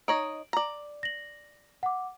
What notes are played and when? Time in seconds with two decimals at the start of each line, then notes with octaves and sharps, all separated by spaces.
0.08 D#4 C#5 D#5 D7 F#7
0.53 D5 A#5
1.03 A#6 F#7
1.83 F#5 D6